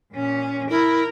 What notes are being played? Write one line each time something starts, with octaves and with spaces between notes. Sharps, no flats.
A#2 C#4
E4 A#4